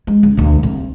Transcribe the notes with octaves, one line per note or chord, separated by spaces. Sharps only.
G#3
C#2
D2 B2
C2